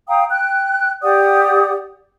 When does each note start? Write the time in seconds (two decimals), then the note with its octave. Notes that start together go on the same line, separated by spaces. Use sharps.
0.08 F5 G5 A#5 D#6
0.30 G5 F#6
1.02 G4 D5 F#5 D#6